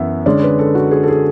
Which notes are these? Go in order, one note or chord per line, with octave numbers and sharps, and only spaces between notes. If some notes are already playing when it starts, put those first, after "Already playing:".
Already playing: F#2 E3 B3 E5 F#5
D3 G#3 C#4 D5
B4
A4
F#4
G#4
A4
G#4